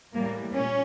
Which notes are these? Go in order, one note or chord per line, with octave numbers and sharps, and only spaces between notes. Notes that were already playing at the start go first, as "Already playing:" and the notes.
A2 E3 G3 A#3
A#2 C#4